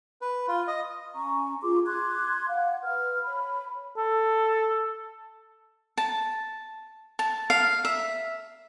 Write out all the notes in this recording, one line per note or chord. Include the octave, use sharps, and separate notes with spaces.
B4
F4
D#5
C#4 G#5 A#5 C#6
F4 G#4 C6 D6
C6 D6 F#6 G#6
F5 F#5
B4 F6
C#5 B5
A4
A5
A5
F5
E5